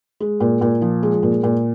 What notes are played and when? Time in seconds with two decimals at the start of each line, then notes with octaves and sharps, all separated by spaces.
0.20 G#3
0.40 A#2
0.61 A#2
0.82 F3
1.03 G#3
1.23 A#2
1.43 A#2